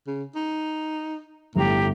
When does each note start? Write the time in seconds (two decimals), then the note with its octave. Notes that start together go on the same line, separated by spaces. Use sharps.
0.07 C#3
0.35 D#4
1.56 G1 A2 G4 A#5